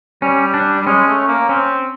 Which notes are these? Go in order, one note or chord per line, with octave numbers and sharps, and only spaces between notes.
G3 C#4
D4
G3
G#3 C#4
A3
A#3
C4 C#4